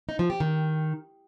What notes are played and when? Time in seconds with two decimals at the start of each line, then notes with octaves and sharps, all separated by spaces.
0.09 D#4
0.19 F3
0.30 G4
0.40 D#3